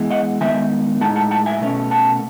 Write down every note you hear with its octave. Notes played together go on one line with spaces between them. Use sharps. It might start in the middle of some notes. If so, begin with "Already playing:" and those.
Already playing: E3 G#3 B3
D#5 F#5
D#3 G#3 B3 D#4 E5 G#5
A2 G#3 D#4 F#5 A5
F#5 A5
F#5 A5
E5 G#5
B2 A3 C#4
F#5 A5